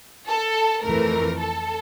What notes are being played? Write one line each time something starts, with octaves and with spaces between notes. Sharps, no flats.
A4
F2 E3 A3 A#4
A4